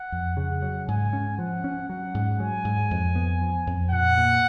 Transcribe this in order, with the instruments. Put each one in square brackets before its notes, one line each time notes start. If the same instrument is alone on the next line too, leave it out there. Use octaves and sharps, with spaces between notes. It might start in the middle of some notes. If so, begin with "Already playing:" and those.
Already playing: [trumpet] F#5
[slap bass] F2
[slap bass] C#3 [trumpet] F#5
[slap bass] F#3
[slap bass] G#2 [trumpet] G#5
[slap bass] C#4
[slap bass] F3 [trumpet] F#5
[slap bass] C#4
[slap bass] F#3 [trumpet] F#5
[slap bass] G#2
[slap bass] F#3 [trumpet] G#5
[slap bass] G#2
F2
B3
F3
F2
[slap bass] A#2 [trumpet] F#5
[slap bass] A#2